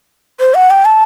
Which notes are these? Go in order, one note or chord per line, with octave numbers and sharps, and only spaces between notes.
C5
F#5
G5
A5